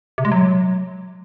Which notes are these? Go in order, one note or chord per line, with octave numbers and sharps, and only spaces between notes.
C3
G#3
F#3